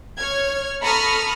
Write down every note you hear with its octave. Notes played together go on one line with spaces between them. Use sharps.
C#5 F6 G#6
A4 A#5 B5 C#6 D#6 F6